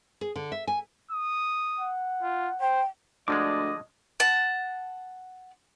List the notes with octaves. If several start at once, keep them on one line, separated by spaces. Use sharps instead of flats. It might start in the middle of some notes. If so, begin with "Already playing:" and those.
G#4
D3
E5
G#5
D#6
F#5
F4
C5 G5
D2 D3 F3 G#3 D5 D#5 D6
F#5 A5